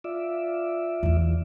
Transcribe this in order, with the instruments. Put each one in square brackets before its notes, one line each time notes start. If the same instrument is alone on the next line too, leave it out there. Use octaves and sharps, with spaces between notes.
[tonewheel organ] F4 D5 E5
[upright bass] E2 E3